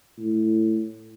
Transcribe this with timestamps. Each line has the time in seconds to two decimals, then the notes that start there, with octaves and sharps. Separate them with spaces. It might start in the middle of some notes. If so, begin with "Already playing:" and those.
0.18 A2